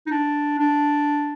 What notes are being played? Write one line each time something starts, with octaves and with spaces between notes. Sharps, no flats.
D#4
D4
D4